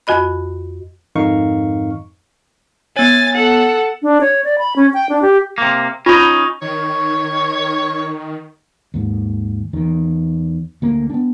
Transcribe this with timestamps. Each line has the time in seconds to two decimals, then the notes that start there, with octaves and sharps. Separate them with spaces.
0.07 F2 F#4 D#5 B5
1.15 F2 G#2 D#3 D#4 F5 C#6
2.97 B3 C#5 G#5 A6
3.35 A4 F#5
4.03 D4
4.21 C#5
4.44 D5
4.58 B5
4.76 C#4
4.94 G5
5.09 D4
5.22 G4
5.58 C3 A#3
6.06 C#4 D#4 F4 B5
6.62 D#3 C#5 C#6
8.94 D#2 G#2
9.73 E2 D#3
10.82 D2 A#3
11.10 B3 D4